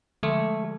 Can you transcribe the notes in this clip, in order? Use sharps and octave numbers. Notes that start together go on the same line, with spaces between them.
D3 F3 G#3 A3